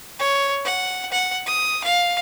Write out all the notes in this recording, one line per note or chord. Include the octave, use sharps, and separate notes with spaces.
C#5
F#5
F#5
D#6
F5